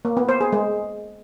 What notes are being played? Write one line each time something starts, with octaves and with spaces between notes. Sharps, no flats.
A#3
B3
C5
G#4
G#3